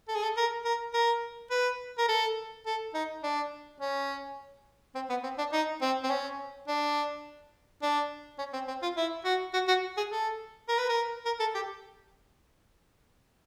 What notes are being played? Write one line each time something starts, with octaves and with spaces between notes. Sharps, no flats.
A4
G#4
A4
A#4
A#4
A#4
B4
A#4
A4
A4
D#4
D4
C#4
C4
B3
C4
D4
D#4
C4
C4
C#4
D4
D4
C#4
C4
C4
F4
E4
F#4
F#4
F#4
G#4
A4
A#4
B4
A#4
A#4
A4
G4